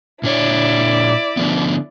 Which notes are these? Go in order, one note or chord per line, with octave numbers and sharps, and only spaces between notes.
A#2 D4 E4 C#5 D5
D3 F3 B3